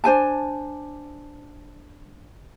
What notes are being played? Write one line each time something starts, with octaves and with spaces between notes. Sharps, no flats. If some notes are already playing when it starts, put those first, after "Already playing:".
D4 C5 G#5 A5